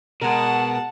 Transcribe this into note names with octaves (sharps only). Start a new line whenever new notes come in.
B2 G#3 A#4 F#5 A5